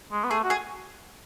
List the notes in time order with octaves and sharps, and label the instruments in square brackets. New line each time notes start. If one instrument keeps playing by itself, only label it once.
[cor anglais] G#3
B3
[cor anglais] A3 [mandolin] G#4
[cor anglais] F#4
[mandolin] G#4